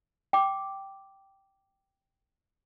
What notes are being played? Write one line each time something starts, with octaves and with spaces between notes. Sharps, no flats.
G5 D6